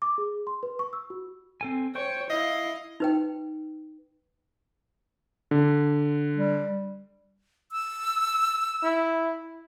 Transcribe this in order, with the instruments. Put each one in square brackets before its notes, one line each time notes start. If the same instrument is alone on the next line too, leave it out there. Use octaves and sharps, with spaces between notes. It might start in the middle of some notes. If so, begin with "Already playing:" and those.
[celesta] D6
G#4
C6
B4
C#6
E6
F#4
[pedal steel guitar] C4 A4 G#5
[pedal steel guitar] C5 G5 C#6 [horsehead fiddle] C#5
[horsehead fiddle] E4 [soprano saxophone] D#5 [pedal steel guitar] F5
[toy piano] D#4 B4 G5
[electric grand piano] D3
[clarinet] G3
[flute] E6
[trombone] E4